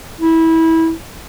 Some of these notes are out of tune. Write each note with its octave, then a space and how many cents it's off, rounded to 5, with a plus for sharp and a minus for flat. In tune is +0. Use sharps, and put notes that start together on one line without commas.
E4 -20